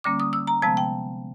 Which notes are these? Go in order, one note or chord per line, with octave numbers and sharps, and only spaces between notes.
D3 G3 A#3 C#4 D6
D#6
E6
A#5
C3 F3 G#3 B3 A5
G5